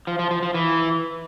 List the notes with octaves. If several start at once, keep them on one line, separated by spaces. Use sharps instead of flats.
F3
F3
F3
F3
E3